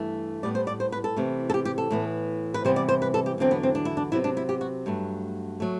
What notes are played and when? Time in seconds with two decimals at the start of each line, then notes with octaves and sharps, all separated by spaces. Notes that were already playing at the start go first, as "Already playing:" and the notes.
Already playing: G2 E3 A3
0.43 A2 G3 B3 D5
0.55 C5
0.67 D5
0.80 C5
0.92 B4
1.04 A4
1.16 C3 E3 A3
1.50 A4
1.54 G4
1.65 G4
1.78 A4
1.91 A2 E3 B3
2.54 B4
2.65 C3 E3 G3 B3 C5
2.76 D5
2.89 C5
3.02 B4
3.14 A4
3.26 G4
3.38 E2 D3 F#3 C4
3.51 B3
3.63 C4
3.75 D4
3.85 E4
3.97 D4
4.12 C3 F#3 B3 E4
4.24 D4
4.37 E4
4.49 G4
4.61 F#4
4.86 G2 F#3 A3
5.60 F#3 A3